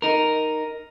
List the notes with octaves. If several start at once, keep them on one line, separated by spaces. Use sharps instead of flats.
D#4 A#4